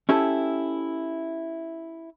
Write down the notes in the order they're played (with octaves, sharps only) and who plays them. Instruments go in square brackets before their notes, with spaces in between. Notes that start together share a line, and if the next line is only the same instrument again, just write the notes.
[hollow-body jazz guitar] C#4 E4 G4 A4